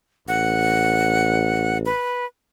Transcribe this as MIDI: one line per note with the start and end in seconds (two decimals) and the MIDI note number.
0.28 1.88 33
0.28 1.78 78
1.86 2.26 71